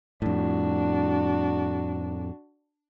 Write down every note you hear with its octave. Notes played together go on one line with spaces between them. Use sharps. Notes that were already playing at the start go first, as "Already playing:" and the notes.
F2 A2 D4 F#4